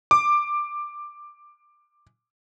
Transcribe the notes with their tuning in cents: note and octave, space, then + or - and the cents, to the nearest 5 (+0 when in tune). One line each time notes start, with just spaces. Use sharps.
D6 +10